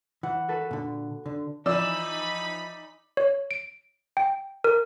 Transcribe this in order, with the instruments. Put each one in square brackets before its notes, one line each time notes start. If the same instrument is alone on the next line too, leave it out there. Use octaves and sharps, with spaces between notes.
[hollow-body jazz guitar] E3 [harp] F#5
[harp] F#4 A4 B4
[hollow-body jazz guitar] A#2 D3
D3
[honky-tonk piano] E3 F3 [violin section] D#4 B5 [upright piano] D5 [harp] E6 E7
[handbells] C#5
D7
G5
A#4